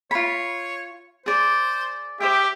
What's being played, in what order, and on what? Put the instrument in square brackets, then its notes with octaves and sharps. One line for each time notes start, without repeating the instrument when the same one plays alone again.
[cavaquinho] F4 B5 [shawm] C#5
[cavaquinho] G#4 D5 [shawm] C5
[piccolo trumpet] G4 [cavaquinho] C5 D#5 G5 [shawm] E5